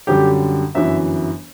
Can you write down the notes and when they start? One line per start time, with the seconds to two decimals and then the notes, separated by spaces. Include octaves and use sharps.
0.07 F#2 D3 G3 G4
0.75 G1 F#2 E3 E5